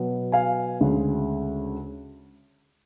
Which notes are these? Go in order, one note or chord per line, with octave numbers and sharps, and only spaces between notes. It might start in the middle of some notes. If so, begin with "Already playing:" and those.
Already playing: B2 F#3 B3
F5 G#5
D2 C#3 G#3